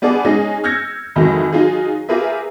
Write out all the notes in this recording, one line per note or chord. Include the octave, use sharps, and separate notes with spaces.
G3 B3 D4 G#4 D5
G#3 C#4 D#4 G#4 D#5
E6 F6 G6 G#6 A#6 C#7
F2 G#2 D#3 E3 F#3
F#3 D#4 F4 G#4
F4 G4 G#4 A#4 B4 E5